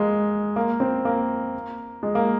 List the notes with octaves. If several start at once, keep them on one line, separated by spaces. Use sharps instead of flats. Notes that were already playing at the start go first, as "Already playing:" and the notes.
Already playing: G#3 A#3
A#3
C4
A#3
G#3
A#3